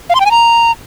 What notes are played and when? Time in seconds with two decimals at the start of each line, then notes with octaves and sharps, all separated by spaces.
0.10 F5
0.15 C6
0.20 G5
0.26 G#5
0.31 A#5